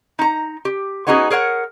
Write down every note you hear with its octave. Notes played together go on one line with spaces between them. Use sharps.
D#4 A#5
G4
B3 C#4 D#4 F#4 G#4
G#4 A#4 C#5 F#5